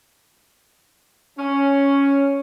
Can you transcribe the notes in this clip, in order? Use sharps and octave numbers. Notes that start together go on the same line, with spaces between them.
C#4